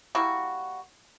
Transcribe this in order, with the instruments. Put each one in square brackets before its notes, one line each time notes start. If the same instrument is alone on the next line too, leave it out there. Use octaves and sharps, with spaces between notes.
[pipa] G3 A#3 E4 F#4